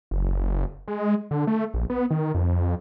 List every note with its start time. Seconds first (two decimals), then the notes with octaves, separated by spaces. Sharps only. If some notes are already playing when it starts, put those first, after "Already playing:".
0.11 F#1
0.88 G#3
1.31 D3
1.47 A3
1.74 A#1
1.90 B3
2.11 D#3
2.35 F2